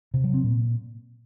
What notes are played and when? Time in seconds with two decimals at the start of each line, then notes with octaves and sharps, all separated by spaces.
0.14 C3
0.24 F#3
0.34 C4
0.44 A#2